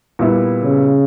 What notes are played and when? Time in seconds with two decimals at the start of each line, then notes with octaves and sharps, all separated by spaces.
0.19 A#2 G3 B3 E4
0.63 C#3